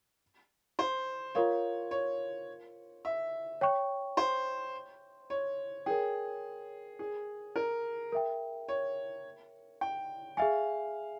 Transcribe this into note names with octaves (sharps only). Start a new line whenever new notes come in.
C5
F4 A#4 C#5 F5
C#5
E5
C#5 G5 C#6
C5
C#5
G#4 A#4 C#5 G5
G#4
A#4
A#4 E5 G5
C#5
G5
G#4 E5 F5 G#5